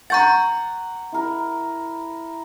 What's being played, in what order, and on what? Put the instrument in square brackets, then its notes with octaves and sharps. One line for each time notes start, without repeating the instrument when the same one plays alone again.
[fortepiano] F#5 C#6 [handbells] A#5 G6 A6
[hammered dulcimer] E4 A#4